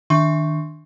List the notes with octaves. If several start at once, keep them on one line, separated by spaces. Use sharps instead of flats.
D#3 D4 E5 C6 C#6